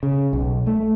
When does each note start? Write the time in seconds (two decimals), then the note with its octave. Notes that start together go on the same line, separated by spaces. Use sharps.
0.03 C#3
0.33 B1
0.67 A3